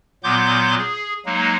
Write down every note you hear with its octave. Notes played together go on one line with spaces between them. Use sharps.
A#2 F#3 B3 C6 D6 G6
G#4
F#3 G#3 A#3 D#4